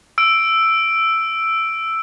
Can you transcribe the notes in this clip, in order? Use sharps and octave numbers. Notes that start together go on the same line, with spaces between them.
E6 D7